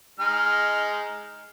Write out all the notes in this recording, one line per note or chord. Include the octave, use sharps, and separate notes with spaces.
G#3 D#4 F6